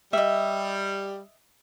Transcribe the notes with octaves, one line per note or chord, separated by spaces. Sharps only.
G3 D#5 E5